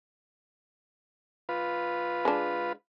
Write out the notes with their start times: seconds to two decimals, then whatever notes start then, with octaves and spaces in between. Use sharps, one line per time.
1.49 F4 B4
2.25 G#3 D4